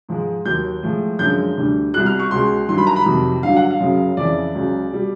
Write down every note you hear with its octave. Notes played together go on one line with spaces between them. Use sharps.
G#2 F3 G#3
D#2 D#3 F#3 G6
A2 F3 G#3
F#2 D3 F3 G#3 G6
D2 D3 G3
C2 B2 G3 F#6
F6
C#6
C#2 B2 G#3 C6
G2 D#3 F#3 C6
B5
A#5
B5
F2 C3 D#3 F#3
G2 D3 F#3 F5
F#5
F5
F#2 C#3 F#3
F2 C#3 E3 D5
C#2 C#3 F#3
B2 G3